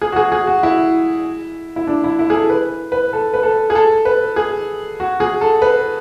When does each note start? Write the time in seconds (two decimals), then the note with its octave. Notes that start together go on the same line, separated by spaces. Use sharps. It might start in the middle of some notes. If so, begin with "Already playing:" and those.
0.02 G#4
0.12 F#4
0.16 G#4
0.32 G#4
0.47 F#4
0.63 E4
1.76 E4
1.87 D4
2.04 E4
2.19 E4
2.30 G#4
2.34 A4
2.50 B4
2.92 B4
3.13 A4
3.34 B4
3.43 A4
3.70 G#4
3.75 A4
4.05 B4
4.36 G#4
5.00 F#4
5.20 G#4
5.41 A4
5.62 B4